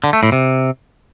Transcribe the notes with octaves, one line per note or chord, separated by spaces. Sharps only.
D3
A3
A2
C3